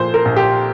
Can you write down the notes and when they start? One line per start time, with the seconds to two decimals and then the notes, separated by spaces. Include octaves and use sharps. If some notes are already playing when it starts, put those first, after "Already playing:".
Already playing: A#2 F3 A3 C5
0.14 A#4
0.25 A#1
0.37 G4